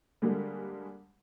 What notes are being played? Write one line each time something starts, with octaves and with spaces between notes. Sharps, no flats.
D3 G3 G#3 A#3